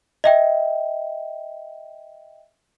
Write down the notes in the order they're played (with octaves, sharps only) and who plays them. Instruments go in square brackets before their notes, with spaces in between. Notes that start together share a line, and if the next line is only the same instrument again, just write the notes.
[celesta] D#5 E5 G5